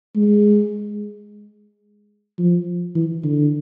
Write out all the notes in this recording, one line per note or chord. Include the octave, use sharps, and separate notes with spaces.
G#3
F3
E3
D3